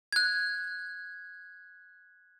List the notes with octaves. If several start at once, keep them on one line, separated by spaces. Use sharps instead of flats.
F#6 G#6